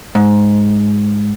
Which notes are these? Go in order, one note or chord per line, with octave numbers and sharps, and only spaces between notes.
G#2